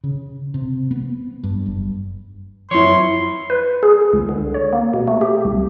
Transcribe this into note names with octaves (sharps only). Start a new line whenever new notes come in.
C#3
C3
B3
G2
F#1
F#2 F3 E4 C#5 C6
B4
G#4
C#2
D3
C#5
A#3
B2
A3
G4
C2